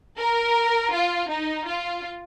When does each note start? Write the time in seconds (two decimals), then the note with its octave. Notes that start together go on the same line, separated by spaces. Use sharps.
0.18 A#4
0.92 F4
1.28 D#4
1.66 F4